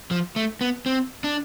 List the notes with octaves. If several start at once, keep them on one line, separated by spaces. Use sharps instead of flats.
F3
A3
B3
C4
D4